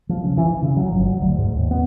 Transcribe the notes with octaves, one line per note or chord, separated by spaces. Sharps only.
F3
C#3
E3
E3
C#3
F#3
G1
F#3
D2
G#2
D#2
B3